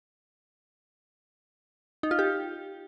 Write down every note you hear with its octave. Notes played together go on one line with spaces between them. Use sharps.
D#4
F4
G4